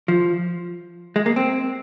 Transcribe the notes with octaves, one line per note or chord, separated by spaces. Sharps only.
F3
G#3
A#3
C4